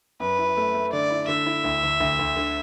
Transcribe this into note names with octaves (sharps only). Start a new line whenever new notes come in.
F#2 B4
E4
A3
A3
D3 D5
E4
D3 E5
E4
D2
D2
D2
D2
D3